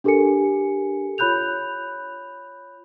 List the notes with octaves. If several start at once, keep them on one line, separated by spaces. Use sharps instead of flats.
D4 G4 A4 A#4 G#5 C#7
F4 C#5 B5 F#6 G6 F7